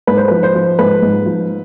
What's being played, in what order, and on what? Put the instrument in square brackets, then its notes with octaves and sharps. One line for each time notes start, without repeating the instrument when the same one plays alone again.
[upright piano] G#2 B4
C5
F3 B4
C5
F3
G#2 B4
G#2
F3